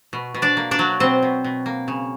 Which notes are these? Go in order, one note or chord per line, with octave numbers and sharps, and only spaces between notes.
B2
B2
D4 D5
A#3
D4 D5
F#3
B2 C4 C5
B2
B2
A#3
C#3